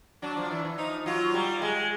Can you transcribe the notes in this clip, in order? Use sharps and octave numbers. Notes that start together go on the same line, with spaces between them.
F#3 D4
F3
E3
E3
F3 D#4
F#3 F4
G3
G#3